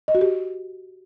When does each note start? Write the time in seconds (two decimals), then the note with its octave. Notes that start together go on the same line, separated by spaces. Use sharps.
0.08 D#5
0.15 F#4
0.21 G4